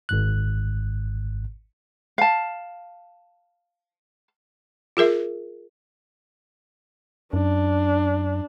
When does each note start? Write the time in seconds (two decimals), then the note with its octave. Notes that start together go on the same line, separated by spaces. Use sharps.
0.09 G#1 G#2 F#6
2.18 F5 A5
4.97 F4 G#4 A#4 E5
7.33 F#2 D4